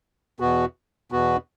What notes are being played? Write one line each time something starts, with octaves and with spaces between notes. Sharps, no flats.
E2 B2 B3 F#4
E2 B2 B3 F#4